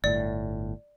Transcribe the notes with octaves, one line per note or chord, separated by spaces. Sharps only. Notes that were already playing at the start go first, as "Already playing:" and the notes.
G1 A2 D5